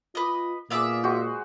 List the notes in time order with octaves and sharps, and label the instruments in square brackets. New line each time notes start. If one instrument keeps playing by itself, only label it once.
[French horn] F4 [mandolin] B4 D#5
[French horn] A#2 [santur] B3 G#4 [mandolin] D5 E5 F5
[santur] G#3 F#4 C5